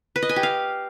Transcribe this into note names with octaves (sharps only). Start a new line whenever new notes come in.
B4
D#5
G#5
G4
F5